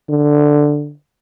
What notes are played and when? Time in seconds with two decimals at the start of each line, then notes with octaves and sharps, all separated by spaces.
0.09 D3